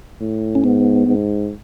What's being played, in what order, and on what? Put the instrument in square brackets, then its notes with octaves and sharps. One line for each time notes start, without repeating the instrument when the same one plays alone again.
[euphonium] A2
[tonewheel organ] C#4
[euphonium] G#2 [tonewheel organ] B3
[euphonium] G#2